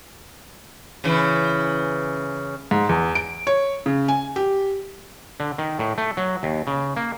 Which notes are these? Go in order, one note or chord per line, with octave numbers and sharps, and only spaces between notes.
C#3 E3
G#2
E2
D7
C#5
C#3
G#5
G4
D3
D#3
A2
A3
F#3
D#2
C#3
A#3